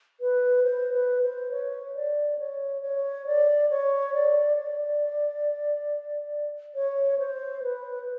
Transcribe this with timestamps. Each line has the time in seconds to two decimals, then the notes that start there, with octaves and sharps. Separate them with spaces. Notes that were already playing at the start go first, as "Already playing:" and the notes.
0.21 B4
0.64 C5
0.93 B4
1.22 C5
1.51 C#5
1.95 D5
2.39 C#5
2.82 C#5
3.26 D5
3.70 C#5
4.14 D5
4.57 D5
6.75 C#5
7.19 C5
7.63 B4